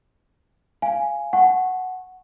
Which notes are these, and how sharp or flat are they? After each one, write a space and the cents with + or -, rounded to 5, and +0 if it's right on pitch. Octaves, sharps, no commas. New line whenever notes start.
F5 -15 G#5 +0
F#5 +0 A5 -35 C#6 -20